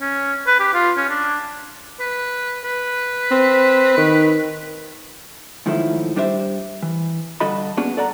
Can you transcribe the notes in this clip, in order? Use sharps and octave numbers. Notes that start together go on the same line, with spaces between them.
C#4
B4
G4
F4
C#4
D4
B4
B4
C4
D#3
G#2 D#3 F3 F#3 A3 E4
G3 D4 G4 C5 E5
E3
G2 D3 F#4 A4 D#5 B5
A#3 B3 C#4 D4 F#4 G#4
A4 D5 F#5 A#5